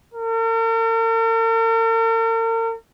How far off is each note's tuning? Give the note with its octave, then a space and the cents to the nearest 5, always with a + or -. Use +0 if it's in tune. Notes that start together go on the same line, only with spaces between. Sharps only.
A#4 -45